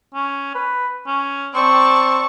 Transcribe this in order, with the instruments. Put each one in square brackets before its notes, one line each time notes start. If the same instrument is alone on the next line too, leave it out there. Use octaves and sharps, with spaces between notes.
[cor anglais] C#4
B4
C#4
[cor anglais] C4 [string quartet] D5 A5 C#6